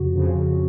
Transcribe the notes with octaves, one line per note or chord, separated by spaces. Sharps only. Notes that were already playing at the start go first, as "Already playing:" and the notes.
Already playing: F2 C#3 F3 F#4
F2 C#3 F3